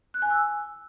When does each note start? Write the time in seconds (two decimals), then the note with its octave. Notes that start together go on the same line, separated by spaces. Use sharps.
0.14 F#6
0.22 G#5
0.30 E6